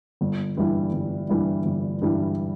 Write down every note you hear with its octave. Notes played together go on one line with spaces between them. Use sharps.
G1
G2 E3 G3 E4
G1
G2 E3 G3 E4
G1
G2 E3 G3 E4